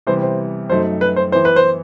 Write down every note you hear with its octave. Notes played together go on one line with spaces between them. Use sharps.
C3 E3 G3 B3 C5
C5
F#2 F#3 A3 D#4 C5
B4
C5
E3 B3 E4 C5
B4
C5